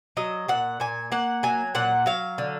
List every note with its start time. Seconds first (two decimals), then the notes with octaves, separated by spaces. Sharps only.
0.17 F#3 D#5
0.48 A#2 F#5
0.80 A#2 G#5
1.12 A#3 F#5
1.43 F#3 G#5
1.75 A#2 F#5
2.06 F#3 F5
2.38 D3